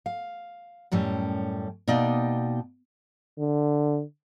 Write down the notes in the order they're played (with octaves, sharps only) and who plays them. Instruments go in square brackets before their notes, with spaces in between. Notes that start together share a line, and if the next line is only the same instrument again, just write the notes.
[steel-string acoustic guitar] F5
F#2 A2 G3 C#4
B2 A#3 D#4 D5 D#5 G5
[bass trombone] D3